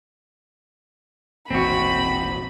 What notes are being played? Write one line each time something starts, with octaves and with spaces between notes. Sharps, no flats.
E1 A1 A#2 C4 F#4 B5